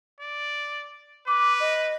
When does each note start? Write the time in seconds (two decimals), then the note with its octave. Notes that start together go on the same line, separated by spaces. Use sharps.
0.21 D5
1.28 B4 D6
1.60 D#5